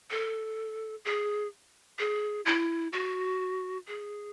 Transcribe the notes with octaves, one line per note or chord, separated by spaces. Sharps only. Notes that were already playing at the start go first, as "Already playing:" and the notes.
A4
G#4
G#4
E4
F#4
G#4